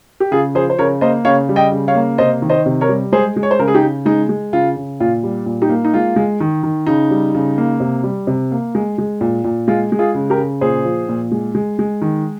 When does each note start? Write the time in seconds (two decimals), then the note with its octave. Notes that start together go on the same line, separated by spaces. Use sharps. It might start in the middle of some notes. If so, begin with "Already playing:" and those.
0.20 G4
0.31 C#3 F4 G#4
0.55 F3 G#4 C5
0.70 C5
0.79 C#3 A#4 C#5
1.01 A#3 C5 D#5
1.25 C#3 C#5 F5
1.49 G3
1.56 D#5 G5
1.72 C#3
1.88 C#5 F5
1.95 A#3
2.18 C3 C5 D#5
2.42 D#3
2.50 C5 D#5
2.66 C3
2.81 A#4 C#5
2.89 G3
3.12 G#3 G#4 C5
3.37 G#3
3.43 C#5
3.51 C5
3.59 C#3 A#4
3.68 G#4
3.74 D#4 G4
3.82 C#3
4.06 G#3 D#4
4.29 G#3
4.53 C#3 F4
4.76 C#3
5.00 A#2 F4
5.23 G3
5.46 A#2
5.62 D#4 G4
5.69 A#3
5.85 D#4
5.94 G#3 F4
6.16 G#3
6.40 D#3
6.63 D#3
6.87 C#3 D#4
7.11 G3
7.35 C#3
7.58 A#3
7.80 C3
8.04 G3
8.27 C3
8.52 A#3
8.75 G#3
8.98 G#3
9.21 A#2
9.44 A#2
9.68 G#3 F4
9.92 G#3
9.99 F4 G#4
10.15 C#3
10.30 G4 A#4
10.38 C#3
10.61 A#2 G#4 C5
10.85 F3
11.09 A#2
11.32 G#3
11.55 G#3
11.79 G#3
12.02 D#3